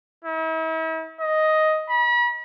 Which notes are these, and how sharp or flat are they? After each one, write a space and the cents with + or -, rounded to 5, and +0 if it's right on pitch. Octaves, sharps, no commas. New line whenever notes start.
E4 -45
D#5 +5
B5 -40